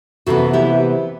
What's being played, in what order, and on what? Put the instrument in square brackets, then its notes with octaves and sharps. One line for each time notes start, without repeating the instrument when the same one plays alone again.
[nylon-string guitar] C3 E3 B3 F#4 A4
E4 G4